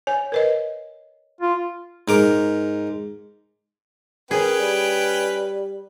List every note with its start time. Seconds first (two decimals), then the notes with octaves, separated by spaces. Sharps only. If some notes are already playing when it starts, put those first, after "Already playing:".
0.07 C#5 G#5
0.32 A#4 B4 D#5
1.41 F4
2.08 G#2 A#4 D6
4.31 C#4 G#4 A#4 B4 G5
4.59 G3